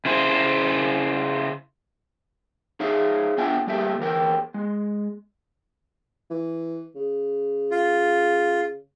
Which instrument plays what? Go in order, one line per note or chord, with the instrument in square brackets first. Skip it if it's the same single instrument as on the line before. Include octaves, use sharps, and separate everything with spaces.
[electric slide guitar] C#3 E4 C5
D#4 G#4 C#5 E5 F5
B3 D4 F4 E5 G5 G#5
G3 A3 A#3 G4 E5
E2 E3 A#4 G5
G#3
[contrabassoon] E3
C#3
[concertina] F4